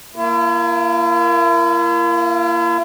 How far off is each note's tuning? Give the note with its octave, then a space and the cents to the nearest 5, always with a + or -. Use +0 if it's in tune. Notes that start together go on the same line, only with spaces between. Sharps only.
A#3 +0 E4 +45